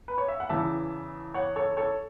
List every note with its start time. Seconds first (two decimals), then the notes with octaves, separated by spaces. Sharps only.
0.08 B4
0.18 C#5
0.28 E5
0.40 F#5
0.49 E2 C#3 E3 E5 A5
1.34 C#5 F#5
1.56 A4 C#5
1.77 A4 C#5